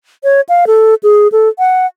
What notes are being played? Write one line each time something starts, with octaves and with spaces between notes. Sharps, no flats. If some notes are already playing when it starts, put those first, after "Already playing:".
C#5
F5
A4
G#4
A4
F#5